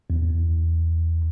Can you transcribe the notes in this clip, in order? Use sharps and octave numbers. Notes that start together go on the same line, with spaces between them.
E2